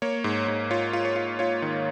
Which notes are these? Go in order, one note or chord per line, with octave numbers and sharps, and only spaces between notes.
A#3 C#5
G#2
G#2
F4 C#5
F4
C#5
F4
F4 C#5
D#3